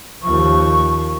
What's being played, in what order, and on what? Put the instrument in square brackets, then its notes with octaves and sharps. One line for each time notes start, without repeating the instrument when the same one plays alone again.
[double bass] D#2 F3 [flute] C#6